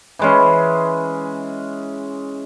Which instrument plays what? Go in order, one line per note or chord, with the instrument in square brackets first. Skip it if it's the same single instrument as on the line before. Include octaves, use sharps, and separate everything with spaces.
[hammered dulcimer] E3 G#3 C#4